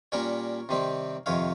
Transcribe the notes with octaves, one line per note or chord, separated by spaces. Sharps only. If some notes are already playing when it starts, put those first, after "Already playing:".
A#2 G3 C#4 A#4 C#5
C3 D#3 G3 C4
F2 C3 D#3 C#5 F5